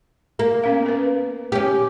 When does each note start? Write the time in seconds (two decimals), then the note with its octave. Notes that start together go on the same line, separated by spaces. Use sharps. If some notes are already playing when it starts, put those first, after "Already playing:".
0.39 A#3
0.64 B3 C#4 F5
0.86 A#4 B4
1.52 C#4 G4